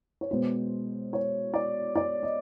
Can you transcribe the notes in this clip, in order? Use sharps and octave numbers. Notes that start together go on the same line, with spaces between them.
C#5
B2 G#3 B3 C5
C#5
D5
D5
D#5